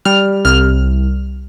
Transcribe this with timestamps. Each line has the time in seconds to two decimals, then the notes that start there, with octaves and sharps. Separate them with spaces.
0.05 G3 F6
0.45 C2 F6